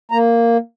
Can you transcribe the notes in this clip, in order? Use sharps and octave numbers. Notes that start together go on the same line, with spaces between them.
A#3 A#5